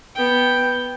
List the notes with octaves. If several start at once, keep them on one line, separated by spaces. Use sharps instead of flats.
B3 G5